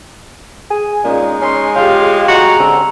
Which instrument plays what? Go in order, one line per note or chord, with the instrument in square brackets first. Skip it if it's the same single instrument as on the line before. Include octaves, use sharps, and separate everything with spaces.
[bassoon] G#4
[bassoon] A#2 [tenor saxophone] G#3 [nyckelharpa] C#4 [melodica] D#4
[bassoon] C#4 [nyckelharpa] C6
[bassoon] C#3 [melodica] F4 G5 [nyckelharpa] G4 F5
[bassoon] G#3 [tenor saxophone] F#4 [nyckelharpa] A#5
[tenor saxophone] D3 [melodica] C4 C#4